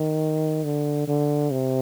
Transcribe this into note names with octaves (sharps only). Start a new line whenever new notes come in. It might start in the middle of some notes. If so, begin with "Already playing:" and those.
Already playing: D#3
D3
D3
C3